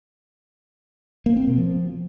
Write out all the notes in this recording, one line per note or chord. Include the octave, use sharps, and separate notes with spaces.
A#3
C4
B2
F3